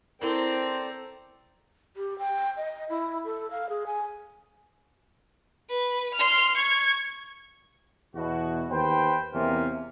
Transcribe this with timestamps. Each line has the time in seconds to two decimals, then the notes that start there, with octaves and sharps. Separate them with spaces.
0.22 C4 E4 A4 A#4 C5 D5 G5 A#5
1.97 G4
2.19 G5
2.57 D#5
2.89 E4
3.25 A4
3.51 F5
3.69 G#4
3.86 G#5
5.69 B4
6.14 C6 F6
6.56 C#6 G#6
8.16 E2 B2 F#4
8.71 D#2 B4 C5 G5
9.35 E2 C3 A#3 C4 C#4 F4